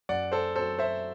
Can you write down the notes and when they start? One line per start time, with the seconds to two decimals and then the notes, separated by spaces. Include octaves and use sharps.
0.09 F#2 D5 F#5
0.32 A4 C5
0.55 F#3 C4 A4 C5
0.79 C5 E5